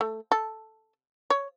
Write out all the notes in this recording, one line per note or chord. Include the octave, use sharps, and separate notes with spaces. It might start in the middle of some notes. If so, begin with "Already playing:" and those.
A3
A4
C#5